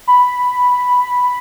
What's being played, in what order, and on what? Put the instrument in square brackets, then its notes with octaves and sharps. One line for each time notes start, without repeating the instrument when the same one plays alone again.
[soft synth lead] B5